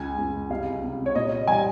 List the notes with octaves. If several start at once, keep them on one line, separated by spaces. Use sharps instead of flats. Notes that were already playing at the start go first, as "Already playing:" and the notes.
Already playing: C#2 G#5
C#2
C2 F5
C3
C#5
A#2 D#5
G3 G#5